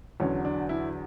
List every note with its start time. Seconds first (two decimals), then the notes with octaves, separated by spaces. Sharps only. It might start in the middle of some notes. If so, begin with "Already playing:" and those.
0.20 E2 D3 F#3 C#4
0.45 D4
0.69 E4